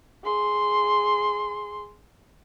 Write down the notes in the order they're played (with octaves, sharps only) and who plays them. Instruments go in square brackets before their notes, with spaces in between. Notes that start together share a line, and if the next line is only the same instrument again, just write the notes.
[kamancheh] G#4 C6